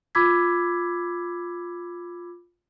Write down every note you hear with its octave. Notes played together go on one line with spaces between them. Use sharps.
F4 B5 D6 E6 G#6 B6